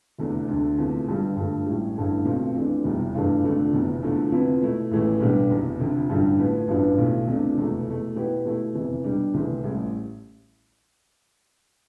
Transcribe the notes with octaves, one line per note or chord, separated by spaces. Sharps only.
F1 E2 D3 A3 D4
D2 D3 A3
E2 C3 F3 A3
G1 G2 D3 G3
G2 F3 A3
A1 A2 G3
A1 G2 D3 A3 E4
B1 B2 A3 C4 F4
F2 E3 A3 D4
F1 E2 B2 G3
G2 E3 A3 D4 F4
F1 F2 D3 A3 D4
F1 E2 B2
E2 D3 F3 A3
F2 C3 F3 B3 E4
B2 A3 E4
A1 A2 E3 A3
B1 B2 G3 B3 D4
F1 E2 B2
F1 F2 D3
A1 G2 D3 G3
A2 F3 B3
A1 G2 F3 B3 D4
B1 B2 A3 E4
E2 C3 F3 A3 D4
F1 E2 B2 A3
E2 B2 A3
B2 B3 E4 G4
B2 A3 E4
F1 E2 C3 E3
B2 G3 D4
C2 C3 E3 A3 C4
A1 A2 G3